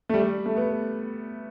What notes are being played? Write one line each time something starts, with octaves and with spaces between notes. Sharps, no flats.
A3
G3
A3
B3